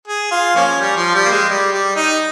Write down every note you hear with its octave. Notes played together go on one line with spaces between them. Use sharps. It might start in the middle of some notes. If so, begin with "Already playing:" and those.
G#4
F4
F3 A#3 C#4
G3
F3
G3
A#3
G#3
G3
G3
D#4